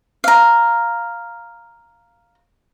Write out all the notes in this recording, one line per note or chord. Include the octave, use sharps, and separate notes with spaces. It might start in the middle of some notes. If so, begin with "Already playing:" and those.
F5 A#5